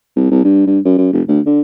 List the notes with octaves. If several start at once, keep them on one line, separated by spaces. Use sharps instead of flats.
C2
C2
G2
G2
F#2
F#2
F1
D2
D3